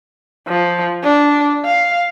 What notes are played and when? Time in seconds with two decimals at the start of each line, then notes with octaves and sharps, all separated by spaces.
0.48 F3
1.03 D4
1.65 F5